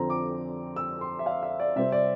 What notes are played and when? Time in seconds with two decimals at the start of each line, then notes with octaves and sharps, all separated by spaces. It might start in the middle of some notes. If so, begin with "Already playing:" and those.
Already playing: F2 D3 F3 C4 A#5
0.10 D6
0.76 E6
1.01 C6
1.19 E5
1.26 F5
1.43 E5
1.60 D5
1.76 C3 G3 C4 E5
1.92 D5